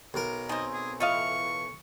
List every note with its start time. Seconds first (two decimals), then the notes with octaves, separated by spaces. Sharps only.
0.14 B1 A#4
0.49 D#3 C4 D#5 G#5
0.74 G#4
1.00 A2 E3 F4 D#5 F5 C#6